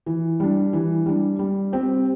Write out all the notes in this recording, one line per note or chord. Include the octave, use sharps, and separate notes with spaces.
E3
G3 D4
E3
G3 D4
G3
C4 G4